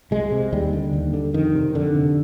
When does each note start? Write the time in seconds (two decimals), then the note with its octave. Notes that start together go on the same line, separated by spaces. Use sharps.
0.11 C2 G#3
0.32 C3
0.53 D#2 G3
0.73 D3
0.93 D#2
1.14 D3
1.34 F2 D#3
1.55 C3
1.74 F2 D3
1.95 C3